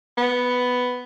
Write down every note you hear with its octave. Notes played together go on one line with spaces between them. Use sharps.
B3